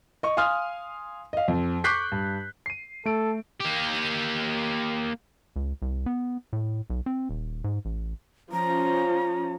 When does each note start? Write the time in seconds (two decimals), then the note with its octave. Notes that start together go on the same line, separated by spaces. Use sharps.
0.23 D#5 C#6
0.37 F5 G#5 C6 D#6 F6
1.33 D#5 F5
1.48 F2
1.84 C#6 D6 F#6 G6 B6 C7
2.12 G2
2.66 C7 D#7
3.05 A3 A4 D7
3.60 A#3 G4
5.56 C#2
5.82 C2
6.06 B3
6.53 A2
6.90 B1
7.06 C4
7.29 D#1
7.64 G#2
7.85 A1
8.52 F3 C#4 A#5